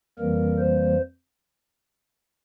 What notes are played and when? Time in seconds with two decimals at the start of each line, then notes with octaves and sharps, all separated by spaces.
0.19 F2 E3 G3 A#3 A#4
0.59 C5